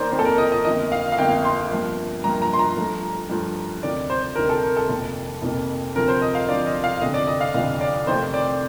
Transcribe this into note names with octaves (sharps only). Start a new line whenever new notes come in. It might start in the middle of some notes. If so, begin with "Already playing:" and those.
Already playing: F2 D#3 A#3 C5 D5 A#5
F2 D#3 A#3 C5
A4
A#4
D#5
D#5
G1 F2 D#3 A#3 D#5
F5
F5
G1 F2 D#3 A#3 G5
C6
G2 F3 A#3
G2 F3 A#3 A#5
A#5
C6
A#5
G2 F3 A3
G2 F3 A3
D2 C3 D#3 D5
C5
D2 C3 D#3 A#4
A4
A#4
A4
F1 F2 D#3 A#3
F1 F2 D#3 A#3
D2 C3 F3 A#4
C5
D#5
F5
D2 C3 F3 D5
D#5
F5
F1 F2 D3 D#5
D5
D#5
F5
F1 F2 D3
D5
F2 C3 D#3 A3 C5
D5